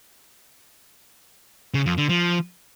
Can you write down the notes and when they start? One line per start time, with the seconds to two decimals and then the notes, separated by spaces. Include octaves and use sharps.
1.74 C#3
1.86 F2
1.98 D3
2.09 F3